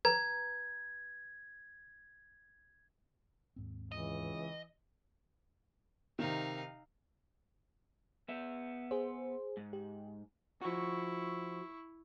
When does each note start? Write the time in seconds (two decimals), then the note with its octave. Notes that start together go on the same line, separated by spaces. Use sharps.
0.05 B4 A#5 G#6
3.56 D#2 G#2 C4
3.92 C#2 E3 D#5
6.19 C3 D#3 D#4 F5
8.28 B3 E5
8.91 G#4 C5
9.57 G#2
9.73 G4
10.62 F3 E4 F#4 C#6